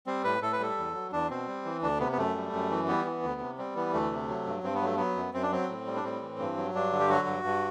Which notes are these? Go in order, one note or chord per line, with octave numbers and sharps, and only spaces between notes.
G3 C4
A2 B4
A2 A4
B4
G3 A4
E2
F#3
E2 D4
B2 C4
G3
E3
D2 D4
C3 B3
B3
F#2 A3
G3
F#2
E3
G3 B3
E3
D2
C3
G3 C4
E3 B3
D2 A3
C3
F#3
G2
G2 C4
B3
F#3 A3
F#3 B3
F#2
F#2 C4
D4
F#3 C4
A2
G3
D4
A2 C4
E3
G2
F#3
G2 D4
D3
G4
F#3 F#4
G2
G2